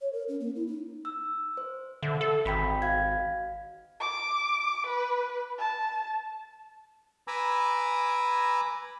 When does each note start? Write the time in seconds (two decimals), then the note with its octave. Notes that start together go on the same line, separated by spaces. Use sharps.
0.01 C#5
0.13 A#4
0.28 C#4
0.40 A#3
0.55 E4
0.67 D#4
1.05 E6
1.57 C5
2.03 D3 E5
2.21 A4
2.45 G#1 G5 B5 B6
2.82 F#4 F5 G#6
4.00 D6
4.87 B4
5.58 A5
7.28 B4 G#5 A#5 B5 D6 E6